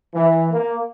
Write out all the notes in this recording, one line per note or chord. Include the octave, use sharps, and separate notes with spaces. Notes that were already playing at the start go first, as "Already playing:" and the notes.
E3
A#3